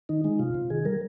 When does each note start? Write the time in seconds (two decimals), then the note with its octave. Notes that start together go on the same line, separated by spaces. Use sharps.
0.09 D#3 D#4
0.24 G#3 D#4
0.39 C3 F4
0.54 C3
0.70 D#3 G#4
0.85 G3 A#4